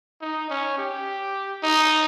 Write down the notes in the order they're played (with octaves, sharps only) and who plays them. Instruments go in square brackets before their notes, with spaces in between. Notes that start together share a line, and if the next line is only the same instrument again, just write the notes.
[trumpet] D#4
C#4
G4
D#4